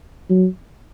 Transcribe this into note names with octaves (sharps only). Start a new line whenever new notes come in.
F#3